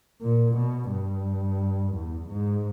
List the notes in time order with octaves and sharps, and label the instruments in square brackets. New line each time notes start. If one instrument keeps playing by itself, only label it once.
[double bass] A#2
B2
G2
E2
G#2